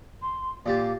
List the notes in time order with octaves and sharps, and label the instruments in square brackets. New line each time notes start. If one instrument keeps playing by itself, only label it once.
[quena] C6
[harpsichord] A#2 G4 A5 [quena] F5